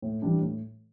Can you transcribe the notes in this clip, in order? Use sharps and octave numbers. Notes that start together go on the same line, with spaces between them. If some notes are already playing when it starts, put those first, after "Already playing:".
A2
E3 G3 D4
A2